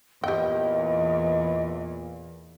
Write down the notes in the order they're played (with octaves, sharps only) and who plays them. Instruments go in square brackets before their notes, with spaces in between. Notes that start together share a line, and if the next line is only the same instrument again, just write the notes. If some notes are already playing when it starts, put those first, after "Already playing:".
[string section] E2 [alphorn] A#2 [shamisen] G4 G5 [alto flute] D#5